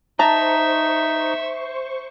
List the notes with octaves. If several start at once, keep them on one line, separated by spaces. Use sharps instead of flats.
D#4 C5 E5 A5 A#5 C#6